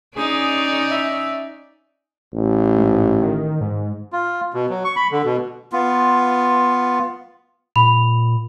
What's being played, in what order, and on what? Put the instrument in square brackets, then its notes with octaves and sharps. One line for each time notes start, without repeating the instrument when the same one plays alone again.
[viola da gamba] C#4 D#4 D5 [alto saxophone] G#4
[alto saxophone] E5
[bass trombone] A1
[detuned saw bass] G#2
D#3
G#2
[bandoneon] F4
B2
F#3
C#6
B5
D3
B2
[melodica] B3 F4
[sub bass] A#2 [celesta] B5 F7